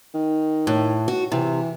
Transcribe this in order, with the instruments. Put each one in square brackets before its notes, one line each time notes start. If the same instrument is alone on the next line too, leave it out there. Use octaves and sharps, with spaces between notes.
[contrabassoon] D#3
[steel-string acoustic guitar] A2
F#4
[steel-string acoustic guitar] C3 [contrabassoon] E3